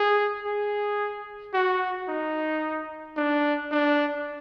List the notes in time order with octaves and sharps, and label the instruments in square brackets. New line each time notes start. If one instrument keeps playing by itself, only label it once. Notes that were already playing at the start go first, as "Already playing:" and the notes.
Already playing: [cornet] G#4
G#4
F#4
D#4
D4
D4